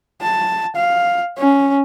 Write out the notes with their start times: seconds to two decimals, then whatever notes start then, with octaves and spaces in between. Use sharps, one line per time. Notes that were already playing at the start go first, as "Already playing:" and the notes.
0.22 A5
0.76 F5
1.38 C#4